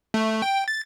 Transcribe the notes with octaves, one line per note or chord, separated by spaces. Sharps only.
A3
G5
A6